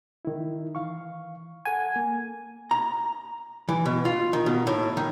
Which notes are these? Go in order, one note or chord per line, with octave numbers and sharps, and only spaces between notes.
D#3 E4
E3 F5 C#6
A4 F#5 G#5
A#3
A#5
E3
B2
F4
D#3
B2
A2
D#3